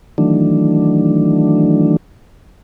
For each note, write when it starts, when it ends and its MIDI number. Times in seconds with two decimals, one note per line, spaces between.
0.18 1.97 51
0.18 1.97 52
0.18 1.97 54
0.18 1.97 57
0.18 1.97 62